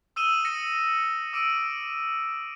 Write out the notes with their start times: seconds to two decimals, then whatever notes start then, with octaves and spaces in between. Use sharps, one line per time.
0.16 D#6 E6 D#7 E7 G7
0.45 A#6 C#7
1.33 D6 E6 D7 D#7